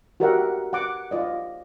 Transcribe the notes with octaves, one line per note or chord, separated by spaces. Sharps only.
F#4 G4 A#4 D5 E5 F#5
F#5 D6
F4 D5 D#5